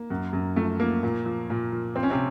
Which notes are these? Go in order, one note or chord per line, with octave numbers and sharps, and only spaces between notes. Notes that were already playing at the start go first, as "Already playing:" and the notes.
Already playing: A#3
F#2
F#2
F3 A3
F3 A#3
A#2
F3
A#2
F3
F3 C4
C#4
C3 C4